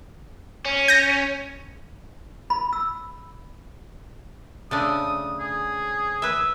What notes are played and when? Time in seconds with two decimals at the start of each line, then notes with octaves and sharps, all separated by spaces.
0.65 C#4
0.88 G6 A#6
2.50 B5
2.73 E6
4.71 C#3 A3 D4 D#6
5.40 G#4
6.22 B4 E5